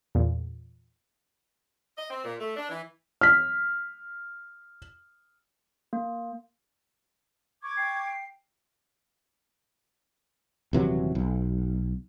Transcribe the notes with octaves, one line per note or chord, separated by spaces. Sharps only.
E2 A#2
D#5
C4
A#2
A3
D4
E3
F6 B6
A#3
C#6 D6 G#6
G5 C7
D#1 C3 E3 F#3
B1